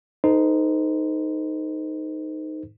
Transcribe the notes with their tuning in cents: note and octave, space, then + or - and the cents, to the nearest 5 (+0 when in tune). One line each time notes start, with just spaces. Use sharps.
D#4 +0 A4 +0 C5 -35